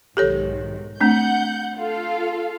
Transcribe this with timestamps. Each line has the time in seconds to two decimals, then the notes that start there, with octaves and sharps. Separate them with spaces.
0.17 B1 G#2 D#3 G4 A4 C#5
1.01 A3 C4 D4 F#5 G6
1.77 F4 A4 F5